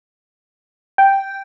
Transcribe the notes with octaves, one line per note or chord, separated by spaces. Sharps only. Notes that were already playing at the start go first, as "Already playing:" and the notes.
G5